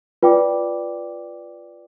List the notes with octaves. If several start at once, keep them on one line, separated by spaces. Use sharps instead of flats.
F4 B4 D5 G5 D6